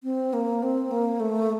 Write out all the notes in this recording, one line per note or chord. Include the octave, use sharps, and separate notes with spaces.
C4
A#3
C4
A#3
A3